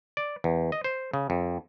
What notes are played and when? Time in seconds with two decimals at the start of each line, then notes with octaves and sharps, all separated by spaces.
0.17 D5
0.44 E2
0.72 D#5
0.84 C5
1.14 C#3
1.30 F2